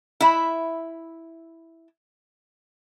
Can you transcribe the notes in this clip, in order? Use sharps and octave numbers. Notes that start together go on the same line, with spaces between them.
E4 E5